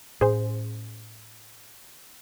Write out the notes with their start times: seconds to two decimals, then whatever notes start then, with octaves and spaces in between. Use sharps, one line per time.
0.21 A2 C#4 G#4 C5